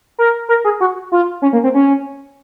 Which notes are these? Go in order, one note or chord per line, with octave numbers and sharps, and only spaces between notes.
A#4
A#4
G#4
F#4
F4
C#4
A#3
C4
C#4